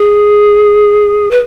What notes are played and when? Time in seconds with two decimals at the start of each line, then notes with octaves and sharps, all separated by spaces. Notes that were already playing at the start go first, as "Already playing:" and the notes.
Already playing: G#4
1.31 B4